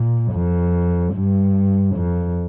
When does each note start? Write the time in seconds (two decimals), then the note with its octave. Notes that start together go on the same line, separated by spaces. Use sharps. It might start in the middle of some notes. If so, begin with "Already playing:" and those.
Already playing: A#2
0.33 F2
1.14 G2
1.95 F2